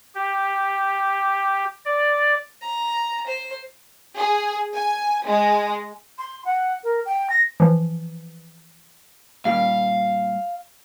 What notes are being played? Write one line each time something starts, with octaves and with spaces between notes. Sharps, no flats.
G4
D5
A#5
C5
G#4
G#5
G#3
C6
F#5
A#4
G5
A#6
E3 F3
A#2 G3 F5